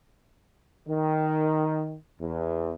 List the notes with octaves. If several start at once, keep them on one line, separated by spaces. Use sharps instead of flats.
D#3
E2